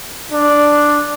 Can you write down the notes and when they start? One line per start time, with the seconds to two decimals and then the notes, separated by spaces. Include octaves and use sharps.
0.32 D4